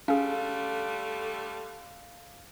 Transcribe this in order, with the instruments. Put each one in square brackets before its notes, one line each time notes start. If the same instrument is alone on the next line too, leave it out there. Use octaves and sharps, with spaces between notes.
[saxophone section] D3 G3 A3 [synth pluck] C#4 G#4 [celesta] F5